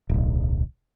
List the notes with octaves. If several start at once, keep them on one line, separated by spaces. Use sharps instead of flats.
D1 B1